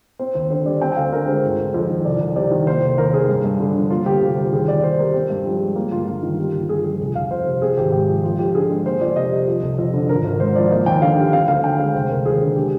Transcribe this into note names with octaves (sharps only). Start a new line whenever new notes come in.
C4 C5
D#2
D3 C5
G3 D5
C4 G5
G5
D2 F5
D3 A#4
G#3 C5
G1
G1
F2
D#3
C2 D5
C2
C3 D5
D#3
A#3 C5
F1
D#2 A#4
D#3 G#4
G2
G2
D3
F3
A#3 F4
D2 G4
C3 F4
G3 G4
D#2 G#4
D#2 D5
D#3 C5
G3 A#4
C4
G2
F3 G4
G#3
A#3 F4
G1 F4
G2 F4
D#3
A#3 G4
G1
G2 G#4
F3 G#4
F1
F1 F5
F2 C5
C3
C4 G#4
G#1 G4
G#2 G4
F3
F2 F4
F2 G4
D3 G#4
G#3
A#3 C5
F2 D5
C3 D#5
G3
F3
F1
F2
D3
G#1 A#4
G#1
G#2 C5
F3 D5
A#3 D#5
D#2 G5
D3 F5
G3
C4 F5
D2 F5
D3 G5
G#3 F5
F1 C5
F1 A#4
D#2 G#4
D3
G#3 G4